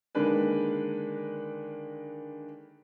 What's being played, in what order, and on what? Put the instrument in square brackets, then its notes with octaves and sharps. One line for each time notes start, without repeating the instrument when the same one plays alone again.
[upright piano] D3 D#3 G#3 A#3 D4 B4